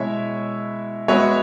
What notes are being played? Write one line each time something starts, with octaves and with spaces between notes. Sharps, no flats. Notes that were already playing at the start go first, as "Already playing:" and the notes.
Already playing: B2 G#3 E4 C#5 E5
G#3 B3 F#4 C#5 E5